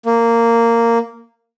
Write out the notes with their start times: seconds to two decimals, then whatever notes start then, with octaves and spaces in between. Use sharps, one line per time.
0.06 A#3